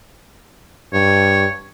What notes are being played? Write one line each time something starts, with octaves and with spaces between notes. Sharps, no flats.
G2 C#5